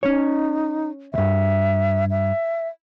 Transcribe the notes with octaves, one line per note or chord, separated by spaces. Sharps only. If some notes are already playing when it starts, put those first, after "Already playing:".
C#4 D#4 C#5
D2 G2 E5
E5